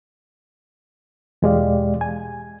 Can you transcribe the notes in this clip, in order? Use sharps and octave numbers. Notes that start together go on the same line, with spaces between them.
E2 B2 G#3 G4 D5 F5
G#5